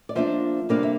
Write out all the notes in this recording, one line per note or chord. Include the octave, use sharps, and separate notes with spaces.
D5
F3 A#3 D4 C5 E5
C3 G3 A#3 D4 D5 F5
E5